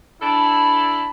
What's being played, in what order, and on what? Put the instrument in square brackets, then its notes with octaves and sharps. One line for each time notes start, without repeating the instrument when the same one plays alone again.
[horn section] D4 E4 A4 A5 B5